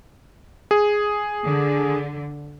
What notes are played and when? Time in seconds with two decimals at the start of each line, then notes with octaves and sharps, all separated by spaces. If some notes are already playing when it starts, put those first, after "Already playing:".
0.71 G#4
1.45 D3